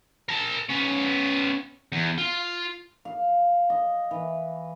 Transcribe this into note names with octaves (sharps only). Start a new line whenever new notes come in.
A#4 A5
B3 C#4
E2
F4
F5
D#5
E3